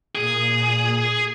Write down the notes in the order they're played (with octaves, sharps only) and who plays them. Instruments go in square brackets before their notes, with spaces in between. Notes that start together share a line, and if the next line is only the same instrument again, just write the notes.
[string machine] A#2 D#6 [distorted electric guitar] G#4